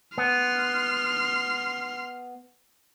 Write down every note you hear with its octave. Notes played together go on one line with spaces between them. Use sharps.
B3 C6 F6